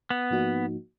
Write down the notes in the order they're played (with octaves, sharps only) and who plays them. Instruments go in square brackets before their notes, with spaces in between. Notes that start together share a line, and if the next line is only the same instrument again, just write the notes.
[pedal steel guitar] B3
[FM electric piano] G#2 F3 A#3 D#4 F#4